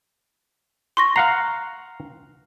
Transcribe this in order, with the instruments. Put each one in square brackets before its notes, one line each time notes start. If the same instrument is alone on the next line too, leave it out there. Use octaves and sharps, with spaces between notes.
[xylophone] C6 C#6 A#6
[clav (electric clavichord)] F5 F#5 A#5 [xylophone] C7